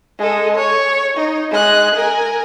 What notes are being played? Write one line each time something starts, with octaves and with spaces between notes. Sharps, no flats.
G#3 A4
C#5
D#4
G#3 F#6
A#4 G#5